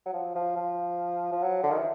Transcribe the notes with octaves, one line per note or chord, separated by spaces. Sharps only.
F#3
F3
F3
F3
F3
F#3
D3
D#3
E3